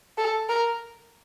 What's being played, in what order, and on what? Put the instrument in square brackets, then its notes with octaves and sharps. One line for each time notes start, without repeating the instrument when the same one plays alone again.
[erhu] A4
A#4